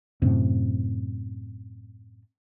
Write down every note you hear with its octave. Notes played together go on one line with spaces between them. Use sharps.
F#2 A2 C3